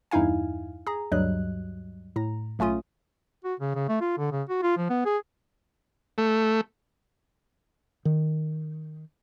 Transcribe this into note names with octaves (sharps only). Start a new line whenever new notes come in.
E2 G2 D#4 E4 F5 G#5
G#4 A#5
D2 G2 F#3 G3 D#5 F#6
A2 A#5
B1 A3 C#4 F4 D#6
F#4
C#3
C#3
A3
F4
D3
C#3
F#4
F4
F3
B3
G#4
A3
D#3